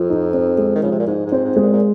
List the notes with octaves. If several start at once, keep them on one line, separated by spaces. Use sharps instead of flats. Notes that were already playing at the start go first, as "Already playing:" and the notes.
Already playing: F2 F3
D#4
C4
G#3
D#3
C#3 F3
C3
A#2
G#2 D#4
G#2
C4
G#2
G#3
A#2
A#2